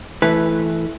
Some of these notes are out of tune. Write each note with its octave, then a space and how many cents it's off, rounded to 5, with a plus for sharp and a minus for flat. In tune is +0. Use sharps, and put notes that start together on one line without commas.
E3 +0 A3 -15 B4 +0